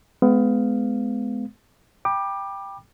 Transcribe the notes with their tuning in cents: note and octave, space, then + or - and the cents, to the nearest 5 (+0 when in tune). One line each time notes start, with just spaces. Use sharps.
G#3 +30 B3 +25 F5 +0
G5 +10 B5 -25 D6 +20